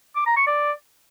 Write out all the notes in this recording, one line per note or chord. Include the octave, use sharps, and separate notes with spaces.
D6
A#5
C#6
D5